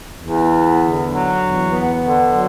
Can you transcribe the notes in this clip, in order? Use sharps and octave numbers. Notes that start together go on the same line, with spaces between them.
E2
B3
D3
F#3
E2
B3
D3
F#3